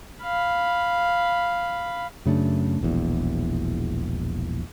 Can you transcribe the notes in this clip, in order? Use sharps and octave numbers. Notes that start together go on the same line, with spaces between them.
F5 B5
F#2 C#3 A3 D4
E1 A#1 E2